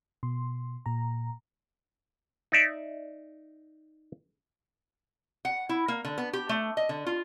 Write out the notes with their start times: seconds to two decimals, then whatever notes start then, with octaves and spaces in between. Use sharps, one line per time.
0.23 B2 C6
0.86 A#2 A#5
2.52 D#4 D5 E5
5.45 F#5
5.69 E4
5.88 A#3
6.05 D3
6.18 B3
6.33 G4
6.49 A3
6.77 D#5
6.89 D3
7.06 F4